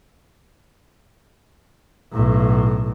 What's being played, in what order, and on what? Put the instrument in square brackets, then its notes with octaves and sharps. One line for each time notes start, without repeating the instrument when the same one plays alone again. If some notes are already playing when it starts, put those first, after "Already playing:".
[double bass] B1 A2